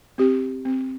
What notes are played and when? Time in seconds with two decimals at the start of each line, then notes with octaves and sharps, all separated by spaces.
0.18 C4 G4
0.65 C4